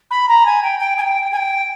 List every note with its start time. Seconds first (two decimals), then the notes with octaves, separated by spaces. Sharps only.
0.11 B5
0.28 A#5
0.45 G#5
0.63 G5
0.79 G5
0.98 G#5
1.01 G5
1.32 G#5
1.37 G5